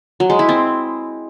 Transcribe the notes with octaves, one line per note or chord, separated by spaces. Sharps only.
F#3
G#3
E4
C4